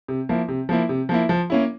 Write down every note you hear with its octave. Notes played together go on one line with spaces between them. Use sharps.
C3
F3 A#3 E4
C3
F3 A#3 E4
C3
F3 A#3 E4
F3
A#3 C#4 E4